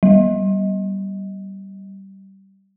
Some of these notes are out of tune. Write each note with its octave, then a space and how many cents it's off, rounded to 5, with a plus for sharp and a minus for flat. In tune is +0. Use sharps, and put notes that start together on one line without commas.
G3 -15